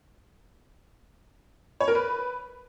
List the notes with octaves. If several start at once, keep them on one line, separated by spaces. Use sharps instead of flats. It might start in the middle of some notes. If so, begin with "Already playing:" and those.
C#5
A#4
B4